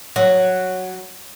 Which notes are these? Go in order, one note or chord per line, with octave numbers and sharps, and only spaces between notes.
F#3